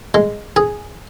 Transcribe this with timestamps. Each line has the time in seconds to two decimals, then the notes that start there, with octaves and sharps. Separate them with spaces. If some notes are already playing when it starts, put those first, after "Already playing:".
0.14 G#3
0.56 G#4